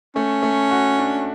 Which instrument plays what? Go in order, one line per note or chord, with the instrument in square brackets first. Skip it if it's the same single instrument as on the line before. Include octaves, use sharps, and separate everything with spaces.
[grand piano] A3 [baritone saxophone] C#4
[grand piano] A3
F#4
D4